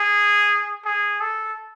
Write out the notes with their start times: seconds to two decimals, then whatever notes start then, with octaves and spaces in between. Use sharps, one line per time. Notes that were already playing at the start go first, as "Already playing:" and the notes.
Already playing: G#4
0.85 G#4
1.21 A4